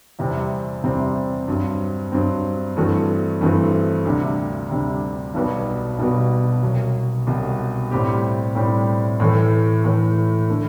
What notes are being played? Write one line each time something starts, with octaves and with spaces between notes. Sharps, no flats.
E2 C3 G3 C4
E2 C3 G3 C4
G2 F#3 C4
G2 F#3 C4
G2 E3 A3 C4 F#4
G2 E3 A3 C4 F#4
D2 C3 G3
D2 C3 G3
B1 B2 G3 B3 F#4
B1 B2 G3 B3 F#4
C2 B2 F#3
C2 B2 F#3
A2 G3 C4 G4
A2 G3 C4 G4
A2 E3 A3
A2 E3 A3
D3 A3